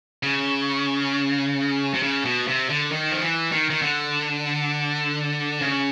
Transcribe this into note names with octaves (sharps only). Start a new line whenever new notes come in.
C#3
C3
C#3
B2
C3
D3
D#3
F3
E3
D#3
D#3
D3
C#3